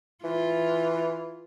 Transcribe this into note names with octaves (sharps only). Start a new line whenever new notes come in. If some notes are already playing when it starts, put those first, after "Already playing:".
E3 F4